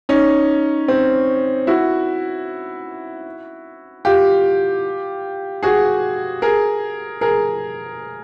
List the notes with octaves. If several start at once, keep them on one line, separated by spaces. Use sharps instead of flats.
C#4 D#4
C4
E4 F#4
F4 G4
F#4 G#4
G#4 A#4
G#4 A#4